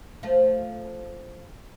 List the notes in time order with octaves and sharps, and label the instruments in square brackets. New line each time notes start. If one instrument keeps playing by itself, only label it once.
[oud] F3 A3